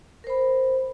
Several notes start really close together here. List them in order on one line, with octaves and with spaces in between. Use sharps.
A#4 C5 B5